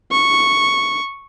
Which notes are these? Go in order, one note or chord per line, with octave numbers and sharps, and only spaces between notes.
C#6